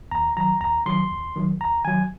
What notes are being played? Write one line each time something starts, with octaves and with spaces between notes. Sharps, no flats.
D#2 A#5
D#3 F#3 A#5
D#2 A#5
D#3 F#3 C6
D#2
D#3 F#3
D#2 A#5
D#3 F#3 G#5